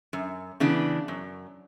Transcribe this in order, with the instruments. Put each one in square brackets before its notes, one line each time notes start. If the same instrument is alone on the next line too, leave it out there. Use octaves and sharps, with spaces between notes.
[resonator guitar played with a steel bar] F#2
C#3 E3 B3 D4
F#2